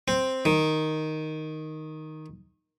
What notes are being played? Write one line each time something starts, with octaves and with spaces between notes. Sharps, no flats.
C4
D#3